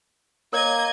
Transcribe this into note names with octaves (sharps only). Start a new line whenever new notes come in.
A#3 A#4 C#5 D#5 G#6